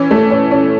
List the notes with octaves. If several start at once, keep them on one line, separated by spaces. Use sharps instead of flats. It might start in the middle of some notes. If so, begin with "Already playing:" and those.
Already playing: E3 C#4
A3
C#4
C#4